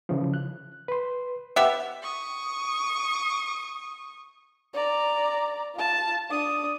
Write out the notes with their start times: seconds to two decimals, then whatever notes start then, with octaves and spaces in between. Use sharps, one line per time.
0.09 C#3 E3 F3
0.34 F#6
0.88 B4 C6
1.56 B3 G4 E5 F#5
2.03 C#6 D#6
4.74 D5 A#5
5.75 F4 A5
6.30 D4 D#6